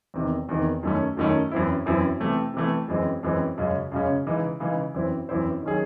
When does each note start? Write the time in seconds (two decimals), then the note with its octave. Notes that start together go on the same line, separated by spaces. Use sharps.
0.14 E2 C3 D#3
0.49 E2 C3 D#3
0.83 F#2 D#3 A3 C#4
1.17 F#2 D#3 A3 C#4
1.51 F#2 E3 C4 E4
1.86 F#2 E3 C4 E4
2.20 C3 E3 A3
2.54 C3 E3 A3
2.88 F#2 E3 G#3 C4
3.23 F#2 E3 G#3 C4
3.58 F#2 C#3 G#3 C#4
3.92 F#2 C#3 G#3 C#4
4.26 C#3 E3 G#3 D#4
4.60 C#3 E3 G#3 D#4
4.94 F#2 E3 C4 E4 C5
5.29 F#2 E3 C4 E4 C5
5.63 D#3 F#3 C#4 G#4